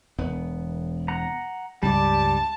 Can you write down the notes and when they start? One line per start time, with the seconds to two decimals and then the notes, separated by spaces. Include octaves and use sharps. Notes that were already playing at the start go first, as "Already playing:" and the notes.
0.18 E1 B3
1.08 F#5 A#5
1.83 C#2 G2 G3 D5 A5